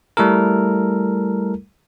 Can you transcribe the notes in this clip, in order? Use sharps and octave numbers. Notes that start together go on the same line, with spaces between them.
G3 A3 E4 A4 A#4